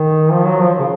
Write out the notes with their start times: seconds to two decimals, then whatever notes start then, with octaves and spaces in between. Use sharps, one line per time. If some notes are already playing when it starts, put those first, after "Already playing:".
Already playing: D#3
0.31 F3
0.45 F#3
0.60 F3
0.80 C#3